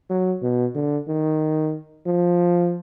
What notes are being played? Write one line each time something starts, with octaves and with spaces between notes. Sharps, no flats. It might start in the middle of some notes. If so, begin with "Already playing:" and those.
F#3
B2
D3
D#3
F3